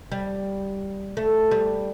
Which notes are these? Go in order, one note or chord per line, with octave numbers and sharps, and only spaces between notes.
G3
A3
G3